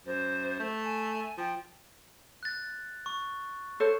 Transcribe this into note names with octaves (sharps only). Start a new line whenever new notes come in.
F#2 C5
A3
G#5
F3 G5
F#6 A6
C#6
A4 C5 C#5